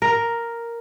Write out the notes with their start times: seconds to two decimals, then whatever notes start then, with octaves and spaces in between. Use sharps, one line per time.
0.02 A#4